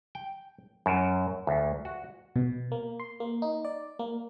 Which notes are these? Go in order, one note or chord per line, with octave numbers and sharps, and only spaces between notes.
G5
F#2
D2
F#4
B2
A#3
C6
A#3
D#4
D5
A#3